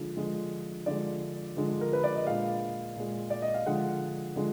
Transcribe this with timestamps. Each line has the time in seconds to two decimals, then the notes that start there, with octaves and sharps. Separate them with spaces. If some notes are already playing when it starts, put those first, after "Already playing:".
Already playing: D3 F3 G#3
0.17 D3 F3 G#3
0.86 D3 F3 G#3 D5
1.57 D3 F3 G#3
1.81 A#4
1.93 B4
2.04 D5
2.15 D#5
2.26 A#2 G#3 F5
2.96 A#2 G#3
3.30 D5
3.42 D#5
3.54 F5
3.66 D3 F3 G#3 F#5
4.36 D3 F3 G#3